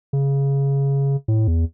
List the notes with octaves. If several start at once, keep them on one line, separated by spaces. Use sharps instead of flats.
C#3
A2
E2